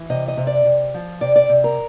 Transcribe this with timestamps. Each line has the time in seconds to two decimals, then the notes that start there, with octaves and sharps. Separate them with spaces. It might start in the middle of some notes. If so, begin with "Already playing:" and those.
Already playing: E3
0.10 C3 D#5
0.28 D#5
0.37 C3
0.47 D5
0.65 C3
0.94 F3
1.21 C3 D5
1.36 D5
1.49 C3
1.64 A#4